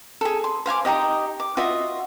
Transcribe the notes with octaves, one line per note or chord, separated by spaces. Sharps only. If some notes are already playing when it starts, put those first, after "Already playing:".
G#4 A4
C6
C5 F5 G#5 D6
D#4 F#4 G4 D#5
D6
F4 F#4 D#5 E5